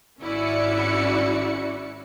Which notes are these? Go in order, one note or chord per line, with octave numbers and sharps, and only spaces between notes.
G#1 C#4 E4 F#4 D5 C#7